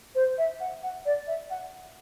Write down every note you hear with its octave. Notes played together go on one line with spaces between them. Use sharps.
C5
E5
F#5
F#5
D5
E5
F#5